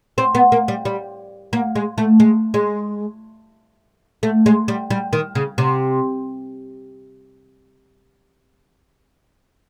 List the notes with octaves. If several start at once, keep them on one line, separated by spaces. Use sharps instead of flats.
C4
B3
A#3
G3
G3
A#3
G#3
A3
G#3
G#3
A3
G#3
G3
G3
D#3
C#3
C3